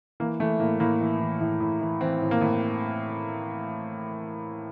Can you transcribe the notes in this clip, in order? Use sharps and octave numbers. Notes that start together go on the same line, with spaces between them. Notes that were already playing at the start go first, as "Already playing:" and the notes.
E3 A#3
E3 A3
A2 A#3
A2 A#3
E3
E3
A2
A2
E3
E3 C4
A2
A#3
A2